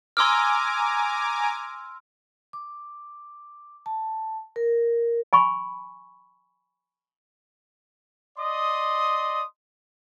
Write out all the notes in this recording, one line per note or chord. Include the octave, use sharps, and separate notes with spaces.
G#5 A#5 C6 D6 E6 F6
D6
A5
A#4
G#5 B5 C#6
D5 D#5 C6 D#6